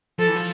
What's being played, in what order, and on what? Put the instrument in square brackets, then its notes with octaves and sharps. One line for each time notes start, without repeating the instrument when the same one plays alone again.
[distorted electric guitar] F3 [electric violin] A4
[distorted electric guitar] E3
F3